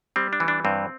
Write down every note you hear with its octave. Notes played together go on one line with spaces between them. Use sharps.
G3 C4
D4
E3
D4
G2 C4